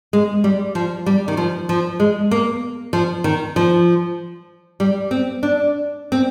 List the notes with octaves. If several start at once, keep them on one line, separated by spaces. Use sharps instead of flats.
G#3
G3
F3
G3
D#3
F3
F3
G#3
A#3
F3
D#3
F3
G3
C4
D4
C4